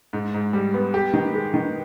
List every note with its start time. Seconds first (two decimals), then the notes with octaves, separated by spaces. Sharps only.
0.13 G#2
0.34 G#2
0.53 G3
0.74 B3
0.94 G4
1.13 D#3
1.33 G#3
1.54 D#3